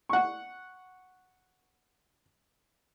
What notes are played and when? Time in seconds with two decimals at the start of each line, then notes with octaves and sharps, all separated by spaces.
0.09 F#5 C#6